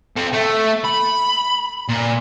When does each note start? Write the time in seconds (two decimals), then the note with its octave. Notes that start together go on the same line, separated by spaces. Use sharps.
0.17 C4 A4
0.33 A3
0.85 B5
1.89 A#2